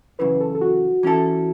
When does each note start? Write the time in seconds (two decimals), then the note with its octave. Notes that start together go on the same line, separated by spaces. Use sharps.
0.19 F#2 C#3 E3 B4
0.40 A4
0.55 A4
0.61 F#4
1.03 E3 C#4 E4 A4